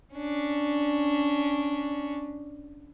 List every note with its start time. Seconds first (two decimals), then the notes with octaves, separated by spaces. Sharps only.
0.15 C#4 D4